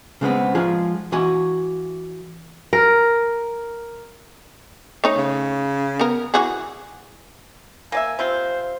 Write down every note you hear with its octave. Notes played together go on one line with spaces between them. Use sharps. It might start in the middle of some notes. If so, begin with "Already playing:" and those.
C#3 G#3 B3 C4
F3 G#3 F4 G#4
E3 F#4 G#5
A#4
A3 D#4 C#5
C#3
B3 A#4
E3 F#4 G#4
A#3 D5 E5 G#5
C3 C4 F4 C5